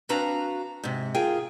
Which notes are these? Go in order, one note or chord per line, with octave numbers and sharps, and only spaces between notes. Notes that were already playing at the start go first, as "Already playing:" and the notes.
C4 D4 F#4 B4 F5 A#5
G#2 C3
F4 G#4 A#4 G5